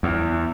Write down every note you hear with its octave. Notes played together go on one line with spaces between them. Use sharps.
E2